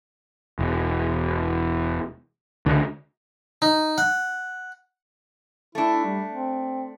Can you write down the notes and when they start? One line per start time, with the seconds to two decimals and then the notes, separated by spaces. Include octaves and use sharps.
0.59 E1
2.66 C#2 D3
3.62 D#4
3.98 F#5
5.75 A3 D4 E4
6.05 G3
6.29 C4